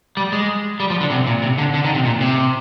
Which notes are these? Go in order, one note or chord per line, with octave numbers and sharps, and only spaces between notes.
G3
G#3
G3
F3
D3
C3
A#2
C3
D3
D3
D#3
C3
A#2
C3